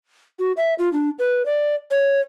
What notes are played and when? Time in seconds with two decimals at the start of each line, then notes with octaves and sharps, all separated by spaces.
0.39 F#4
0.57 E5
0.79 F4
0.93 D4
1.19 B4
1.46 D5
1.91 C#5